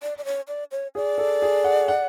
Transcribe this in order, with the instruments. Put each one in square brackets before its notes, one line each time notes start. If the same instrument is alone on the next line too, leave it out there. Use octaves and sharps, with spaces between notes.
[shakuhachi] D5
D5
C#5
D5
C#5
[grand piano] G#4 [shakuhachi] D5
[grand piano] A4
G#4
F#5
F#5